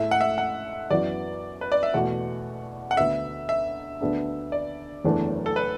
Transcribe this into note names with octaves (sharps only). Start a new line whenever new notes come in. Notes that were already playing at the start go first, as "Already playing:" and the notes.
Already playing: A2 A3 E4 E5
F#5
E5
F#5
F#2 E3 B3 F#4 D5
B4
D5
E5
E2 B2 A3 F#4 F#5
F#5
D2 D3 B3 E5
E5
D2 D3 B3 D4
D5
F#1 E2 E3 A3 D4
A4
B4